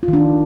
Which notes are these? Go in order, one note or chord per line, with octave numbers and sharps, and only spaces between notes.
F4
D#3
D4